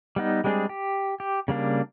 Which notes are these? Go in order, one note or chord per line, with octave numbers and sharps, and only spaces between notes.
G3 B3 D#4
G3 G#3 C4 D4 G#4
G4
G4
C#3 G3 A#3 D4